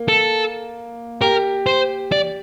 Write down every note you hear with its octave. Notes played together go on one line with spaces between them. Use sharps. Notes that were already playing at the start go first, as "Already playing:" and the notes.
Already playing: A#3
A4
G4 A#4
C5
D5